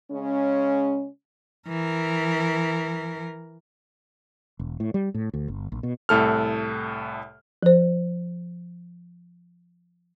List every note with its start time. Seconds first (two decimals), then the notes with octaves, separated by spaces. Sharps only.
0.11 C#3 G#3 C#4
1.68 E3 A#4
4.59 E1
4.80 A2
4.94 G3
5.14 A2
5.34 D2
5.48 G1
5.72 A#1
5.83 B2
6.09 C2 A2 A4 F6
7.63 F3 C5